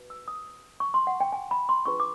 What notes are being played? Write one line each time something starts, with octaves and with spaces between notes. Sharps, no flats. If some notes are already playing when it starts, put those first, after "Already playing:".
Already playing: F#4 B4
E6
D#6
C#6
C6
F#5
G5
G#5
B5
C6
D4 F4 G#4 B4 C#6
D6